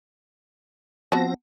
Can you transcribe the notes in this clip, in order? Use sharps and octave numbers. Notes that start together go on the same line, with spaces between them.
F3 B3 C4 F#4 A5 A#6